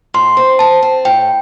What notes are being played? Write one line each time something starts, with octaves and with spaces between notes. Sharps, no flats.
A2 C6
C4
C4 A5
C4
A2 G5